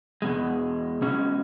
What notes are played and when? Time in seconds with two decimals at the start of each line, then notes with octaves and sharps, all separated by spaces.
0.22 E2 B2 G#3
1.02 B2 G#3 C#4